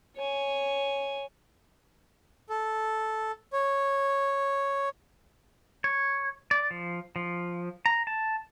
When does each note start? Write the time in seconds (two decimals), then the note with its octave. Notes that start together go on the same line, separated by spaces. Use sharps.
0.16 C#5 G#5
2.50 A4
3.53 C#5
5.84 C#5
6.51 D5
6.71 F3
7.16 F3
7.86 A#5
8.07 A5